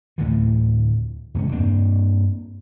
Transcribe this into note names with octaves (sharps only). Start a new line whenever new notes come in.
D2 A2 D3 E3
E2 C#3 G#3 C#4
G2 A#3 C4 D4